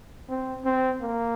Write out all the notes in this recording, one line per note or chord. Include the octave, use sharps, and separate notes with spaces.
C4
C4
A#3